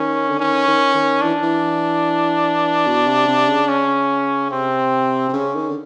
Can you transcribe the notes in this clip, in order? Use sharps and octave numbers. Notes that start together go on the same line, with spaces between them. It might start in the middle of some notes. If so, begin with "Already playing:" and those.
Already playing: D#3 C#4
D3
D#3 C#4
D#3
D#3
E3 D4
E3
B2
C3
C3
C#3
C#4
C3 C4
C3
C#3 C#4
D#3
D3